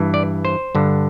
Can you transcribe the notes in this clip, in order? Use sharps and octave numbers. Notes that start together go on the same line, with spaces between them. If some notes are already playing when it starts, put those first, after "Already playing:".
Already playing: G2 E3
D5
C5
G2 D3